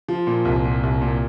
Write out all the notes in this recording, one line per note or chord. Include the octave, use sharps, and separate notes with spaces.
F3
A#2
C2
A#2
C2
A#2